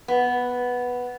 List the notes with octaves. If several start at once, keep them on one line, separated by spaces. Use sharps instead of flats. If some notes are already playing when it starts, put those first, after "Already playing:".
B3